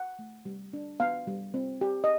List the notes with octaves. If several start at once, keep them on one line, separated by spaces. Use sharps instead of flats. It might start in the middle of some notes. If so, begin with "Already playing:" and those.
Already playing: F#5
A3
G3
D4
B3 F5
G3
C4
G4
D#5